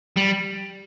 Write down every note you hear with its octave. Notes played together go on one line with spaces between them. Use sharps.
G3